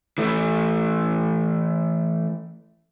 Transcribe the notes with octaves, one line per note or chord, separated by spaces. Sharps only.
E3 A3